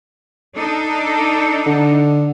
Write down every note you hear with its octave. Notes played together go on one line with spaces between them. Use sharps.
D4 D#4 A4
D3